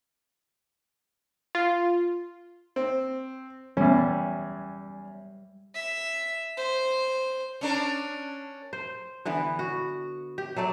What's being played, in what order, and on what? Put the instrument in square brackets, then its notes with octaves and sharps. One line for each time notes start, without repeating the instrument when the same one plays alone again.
[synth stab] F4
[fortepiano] C4
[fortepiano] E2 C#4 [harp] G3
[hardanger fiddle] E5
C5
[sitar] C#4 D4 A#4
[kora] C5
D3 E3 B3 B4
F#4
G4
F#3 A3 A4 D5